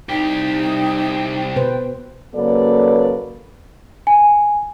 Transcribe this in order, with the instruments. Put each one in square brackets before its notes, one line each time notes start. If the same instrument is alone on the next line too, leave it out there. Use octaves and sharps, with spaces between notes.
[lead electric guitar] C2 G4 [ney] D#4 [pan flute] G5
[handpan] B2 B4 C5
[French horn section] C#3 F#3 A#3 A4 B4 D5
[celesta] G#5